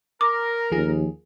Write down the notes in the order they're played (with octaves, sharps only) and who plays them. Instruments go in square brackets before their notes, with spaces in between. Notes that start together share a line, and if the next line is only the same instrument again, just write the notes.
[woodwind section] A#4 [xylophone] D6
[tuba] D#2 [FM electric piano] F3 A#3 G#4